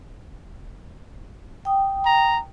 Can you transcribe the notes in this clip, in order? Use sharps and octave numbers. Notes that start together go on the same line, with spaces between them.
G5 D#6
A#5